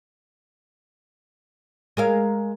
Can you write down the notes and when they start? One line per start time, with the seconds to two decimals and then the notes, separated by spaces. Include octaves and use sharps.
1.97 G#3 A#4 F5